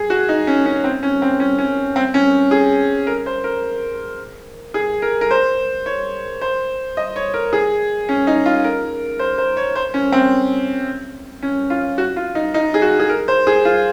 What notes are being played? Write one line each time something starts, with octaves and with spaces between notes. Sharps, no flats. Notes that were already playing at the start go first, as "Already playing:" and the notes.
Already playing: G#4
F#4
D#4
C#4
C#4
C4
C#4
C4
C#4
C#4
C4
C#4
G#4
A#4
C5
A#4
G#4
A#4
A#4
C5
C#5
C5
D#5
C#5
A#4
G#4
C#4
D#4
F4
A#4
C5
C5
C#5
C5
C#4
C4
C#4
F4
F#4
F4
D#4
D#4
G#4
F#4
G#4
A#4
C5
G#4
F4